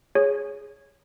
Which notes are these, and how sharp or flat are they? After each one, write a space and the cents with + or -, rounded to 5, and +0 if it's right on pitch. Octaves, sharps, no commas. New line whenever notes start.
G#4 +0 C#5 +0